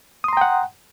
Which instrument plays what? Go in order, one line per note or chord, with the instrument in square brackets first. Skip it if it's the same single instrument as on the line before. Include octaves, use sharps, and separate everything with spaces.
[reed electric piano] D#6
C6
A#5
G5
F#5